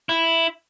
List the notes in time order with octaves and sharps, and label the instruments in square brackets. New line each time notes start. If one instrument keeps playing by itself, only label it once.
[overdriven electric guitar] E4